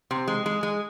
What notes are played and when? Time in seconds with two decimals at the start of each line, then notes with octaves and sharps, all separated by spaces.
0.11 C3
0.28 G#3
0.46 G#3
0.63 G#3